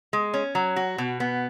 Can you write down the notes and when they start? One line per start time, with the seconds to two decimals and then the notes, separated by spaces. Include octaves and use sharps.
0.13 G#3
0.34 C#4
0.55 F#3
0.76 F#4
0.98 B2
1.20 B3